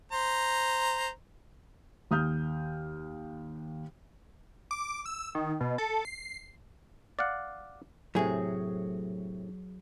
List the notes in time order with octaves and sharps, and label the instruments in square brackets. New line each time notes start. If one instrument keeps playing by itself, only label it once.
[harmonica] C5 A#5
[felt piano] D#2 D#6 F6 G6
[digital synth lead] D6
E6
D#3
B2
A4
C7
[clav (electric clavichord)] D5 F5 F#5
[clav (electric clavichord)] A2 C3 [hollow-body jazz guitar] F#3 G#4